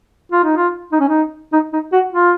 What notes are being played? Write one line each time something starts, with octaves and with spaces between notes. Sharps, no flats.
F4
D#4
F4
D#4
C#4
D#4
D#4
D#4
F#4
F4